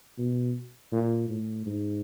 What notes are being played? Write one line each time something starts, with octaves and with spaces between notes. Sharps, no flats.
B2
A#2
A2
G#2